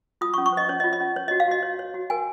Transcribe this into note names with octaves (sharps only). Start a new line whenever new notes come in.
F4 D#6
C#6
C#4
C#6
C5 D#5
C#4 C#5
D#5
F4
D#5
C#4
C#5
F#4 D#5
F5
F#4 D#5
C#5
C#5
F#4
A#4 G#5